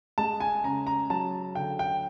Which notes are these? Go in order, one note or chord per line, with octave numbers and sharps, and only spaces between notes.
G#3 A5
G#5
C#3 A#5
A#5
F#3 A5
D3 G5
G5